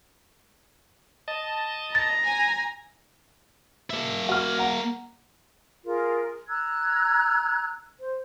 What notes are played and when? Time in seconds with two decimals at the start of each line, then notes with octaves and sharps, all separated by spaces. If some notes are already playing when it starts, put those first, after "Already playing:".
1.28 D#5 A5
1.95 A#5 A6
2.26 G#5
3.90 A#3 E5
4.29 F#4 F6
4.59 F#5 A#5
5.84 F4 G#4 A#4
6.48 A#5 E6 F#6 G#6
8.00 C5